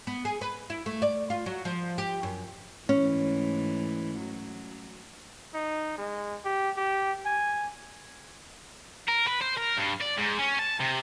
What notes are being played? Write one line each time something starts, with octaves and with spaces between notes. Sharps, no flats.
B3
G#4
B4
E4
A3
D5
F4
F#3
F3
G4
F#2
G#2 E3 A3 C#4
F#3
D#4
G#3
G4
G4
G#5
A#4
B4
C5
A#4
G2
D5
G#2
C#4
A5
C3